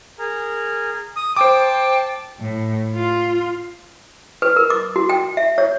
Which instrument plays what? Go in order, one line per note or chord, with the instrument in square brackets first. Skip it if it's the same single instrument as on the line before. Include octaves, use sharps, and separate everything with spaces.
[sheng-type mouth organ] G#4 A#4
[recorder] D#6
[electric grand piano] C5 D6 [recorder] G5 [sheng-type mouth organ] A5
[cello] A2
F4
[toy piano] B4
A#4
D6
F#4
G5
E5
C#5